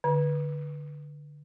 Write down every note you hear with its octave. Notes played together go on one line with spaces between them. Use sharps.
D3